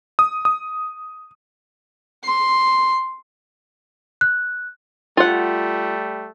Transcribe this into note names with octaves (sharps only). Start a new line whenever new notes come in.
D#6
D#6
C6
F#6
G3 A3 F4 F#5